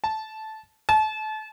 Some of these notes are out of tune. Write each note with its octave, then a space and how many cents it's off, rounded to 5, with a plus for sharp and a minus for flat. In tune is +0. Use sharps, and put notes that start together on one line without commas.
A5 -10
A5 -30